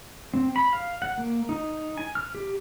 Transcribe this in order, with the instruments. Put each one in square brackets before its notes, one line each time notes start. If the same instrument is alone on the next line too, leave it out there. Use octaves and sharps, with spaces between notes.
[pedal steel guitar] C4
B5
F5
F#5
A#3
D#4
G#5
F6
G4